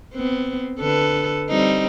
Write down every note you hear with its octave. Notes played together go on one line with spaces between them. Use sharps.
B3 C4
D3 A4 B4
G3 C4 D#4